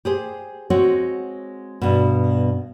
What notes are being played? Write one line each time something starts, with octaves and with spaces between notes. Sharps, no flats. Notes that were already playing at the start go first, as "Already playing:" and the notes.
G4 G#4 C5
G#3 C4 F#4 C#5
G2 B2